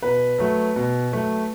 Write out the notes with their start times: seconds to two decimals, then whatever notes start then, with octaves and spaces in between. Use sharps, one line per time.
0.02 B2 B4
0.38 F#3 A3
0.76 B2
1.12 F#3 A3